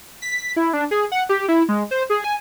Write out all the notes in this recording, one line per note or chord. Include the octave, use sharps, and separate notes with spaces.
B6
E4
D4
G#4
F#5
G4
E4
G#3
C5
G#4
G#5